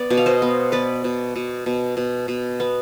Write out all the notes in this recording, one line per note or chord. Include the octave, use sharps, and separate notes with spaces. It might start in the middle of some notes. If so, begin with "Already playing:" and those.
Already playing: B3 D5
B2
F5
C5 D#5
B3
B3 B4 D5
B2
B2
B2
B2
B2
B3